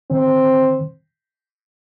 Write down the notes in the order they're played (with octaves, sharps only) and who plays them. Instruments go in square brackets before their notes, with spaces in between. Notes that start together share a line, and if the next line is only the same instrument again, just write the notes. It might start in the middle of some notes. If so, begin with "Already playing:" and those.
[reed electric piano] D#3 [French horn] C4